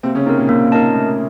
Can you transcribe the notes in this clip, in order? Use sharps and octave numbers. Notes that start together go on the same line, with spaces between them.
C3 A#3 C4
C#3 C#4
C3 C4 D#4 A#4
A#2 A#3
A#3
D#4 A#4 D#5 A5
A3